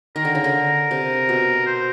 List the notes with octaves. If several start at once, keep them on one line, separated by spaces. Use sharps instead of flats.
D#3 A#4
D3
C#3
D3
C3
B2
C5